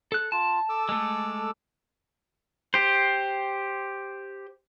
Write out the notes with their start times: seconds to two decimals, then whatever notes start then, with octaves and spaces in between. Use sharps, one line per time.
0.12 A4 F#6
0.32 F4 A5
0.69 A4 D6 E6
0.89 G#3 A3
2.74 G4 C5